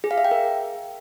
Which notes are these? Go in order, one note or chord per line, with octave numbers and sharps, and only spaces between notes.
G#4
F5
E5
G5
A#4